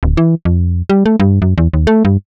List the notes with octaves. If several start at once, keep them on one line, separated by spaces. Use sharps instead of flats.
D1
E3
F2
G3
A3
G2
F#2
E2
D#2
A3
G2